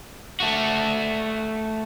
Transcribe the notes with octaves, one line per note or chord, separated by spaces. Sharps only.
A3 F#4